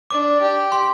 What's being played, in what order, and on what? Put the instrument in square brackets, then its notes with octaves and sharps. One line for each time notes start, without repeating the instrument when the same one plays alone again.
[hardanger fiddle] D4 [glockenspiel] D6
[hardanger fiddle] G4
[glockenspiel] C6